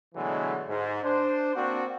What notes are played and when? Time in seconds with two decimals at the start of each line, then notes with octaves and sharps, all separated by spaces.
0.15 B2 D3 E3 F#3 G#3 A3
0.69 G#2
1.03 D4 C5
1.55 A#3 C4 D4 F#4